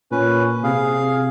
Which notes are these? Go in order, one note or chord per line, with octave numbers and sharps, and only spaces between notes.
A#2 C#4 B4
C3 G#4 F5